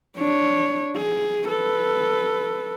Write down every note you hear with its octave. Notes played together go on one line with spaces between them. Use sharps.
D4 C#5
G#4
A4 B4